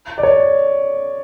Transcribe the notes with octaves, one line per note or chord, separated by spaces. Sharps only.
D5
C#5